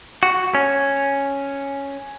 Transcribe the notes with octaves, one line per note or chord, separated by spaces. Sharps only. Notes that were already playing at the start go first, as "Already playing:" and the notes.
F#4
C#4